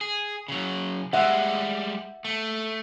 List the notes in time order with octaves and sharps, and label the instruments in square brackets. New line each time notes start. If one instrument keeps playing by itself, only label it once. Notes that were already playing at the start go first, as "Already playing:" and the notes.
[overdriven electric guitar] G#4
C#3 F#3
[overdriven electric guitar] G3 G#3 [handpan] E5 F#5
[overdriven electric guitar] A3